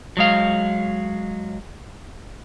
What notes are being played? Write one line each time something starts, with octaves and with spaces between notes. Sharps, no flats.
F#3 G#3 F5